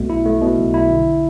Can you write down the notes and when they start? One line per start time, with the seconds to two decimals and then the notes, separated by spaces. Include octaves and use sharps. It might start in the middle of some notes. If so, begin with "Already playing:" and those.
Already playing: B1 B2 A3
0.10 E4
0.25 A3
0.42 B2
0.57 B1
0.74 E4
0.90 D3